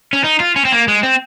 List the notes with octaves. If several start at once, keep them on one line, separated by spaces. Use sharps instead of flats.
C#4
D#4
F4
C#4
C4
A#3
G#3
C4